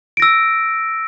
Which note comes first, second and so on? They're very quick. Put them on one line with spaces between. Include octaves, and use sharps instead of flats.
D7 A#6 E6